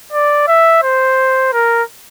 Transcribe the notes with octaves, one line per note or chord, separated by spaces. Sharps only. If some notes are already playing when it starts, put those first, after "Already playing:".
D5
E5
C5
A#4